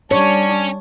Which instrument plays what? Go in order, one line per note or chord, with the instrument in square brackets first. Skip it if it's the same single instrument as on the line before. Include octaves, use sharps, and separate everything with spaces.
[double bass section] G3 [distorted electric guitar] C#4 [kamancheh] D4 [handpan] C#5